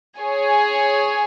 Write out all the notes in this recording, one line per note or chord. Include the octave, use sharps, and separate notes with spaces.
G#4 C#5 G#5